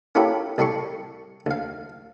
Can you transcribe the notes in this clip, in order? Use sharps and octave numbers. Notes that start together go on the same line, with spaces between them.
A#3 C#4 E4 F#4 G4 A4
C2 G3 A4 C6 C#6
D2 F5